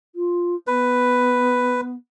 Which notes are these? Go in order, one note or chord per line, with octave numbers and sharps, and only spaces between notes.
F4
B3 B4